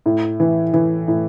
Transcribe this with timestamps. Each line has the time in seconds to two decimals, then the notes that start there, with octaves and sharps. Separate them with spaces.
0.06 A2
0.40 E3
0.73 E3
1.08 A2